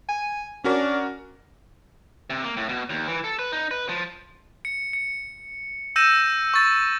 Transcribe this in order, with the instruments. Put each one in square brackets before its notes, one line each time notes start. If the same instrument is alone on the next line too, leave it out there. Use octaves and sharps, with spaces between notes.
[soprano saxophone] G#5
[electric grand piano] C#4 F#4 A#4 [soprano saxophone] D4
[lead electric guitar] C3
A#3
A2
B2
D#2
E3
A4
B4
D#4
B4
F3
[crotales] C#7
C#7
E6 G6 A#6 D#7 E7
C#6 A6